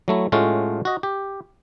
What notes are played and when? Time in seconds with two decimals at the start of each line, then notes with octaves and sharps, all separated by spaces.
0.08 F#3 A3 E4
0.32 A2 G#3 A3 C#4 F4 F#4
0.85 F#4 D#5
1.03 G4